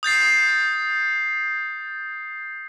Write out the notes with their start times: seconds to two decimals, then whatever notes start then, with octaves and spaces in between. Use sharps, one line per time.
0.03 D#6 G6 A6 C7